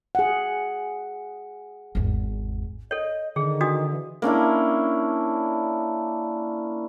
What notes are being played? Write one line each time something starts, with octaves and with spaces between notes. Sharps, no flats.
G#4 F#5
G#1 E2
A4 C#5 D#5
D3 D#3 G#4
D4 F#4 D#6
E3
A#3 C#4 D4 E4